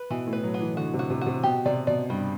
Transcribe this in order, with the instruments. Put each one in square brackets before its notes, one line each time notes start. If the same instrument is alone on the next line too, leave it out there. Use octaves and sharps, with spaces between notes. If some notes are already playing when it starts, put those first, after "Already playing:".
Already playing: [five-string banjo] B4
[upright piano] B2 [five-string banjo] E3
[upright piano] A2
[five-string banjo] B4
[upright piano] F#3
[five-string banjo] B3
[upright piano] E3
[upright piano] D3 [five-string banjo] F#4
[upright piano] C3
[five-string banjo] F#4
[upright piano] C3
[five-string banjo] F#4
[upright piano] C3
[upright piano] B2 [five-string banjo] G4
[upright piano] C3 [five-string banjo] D5
[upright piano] B2 [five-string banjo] D5
[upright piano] G2 [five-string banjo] G3